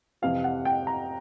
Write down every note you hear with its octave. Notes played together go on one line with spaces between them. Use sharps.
F2 C3 E3 F5
F#5
G5
A#5